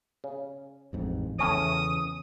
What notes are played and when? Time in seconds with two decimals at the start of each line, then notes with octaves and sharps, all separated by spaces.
0.24 C#3
0.93 A1 F2 G#2
1.39 E2 A2 C#3 C#4 C#5 D#6